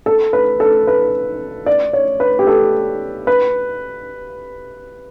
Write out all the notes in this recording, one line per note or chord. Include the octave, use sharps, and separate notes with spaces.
A4
B4
A4
B4
D5
C#5
B4
G4
A4
B4